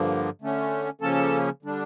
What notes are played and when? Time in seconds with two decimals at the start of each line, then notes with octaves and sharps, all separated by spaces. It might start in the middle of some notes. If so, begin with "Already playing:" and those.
Already playing: G2 D3 F3 A#3
0.42 D3 A3 C#4
1.01 C#3 F3 A#3 C#4 A4 A5
1.63 D3 G3 D4